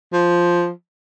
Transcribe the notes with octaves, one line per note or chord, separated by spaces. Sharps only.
F3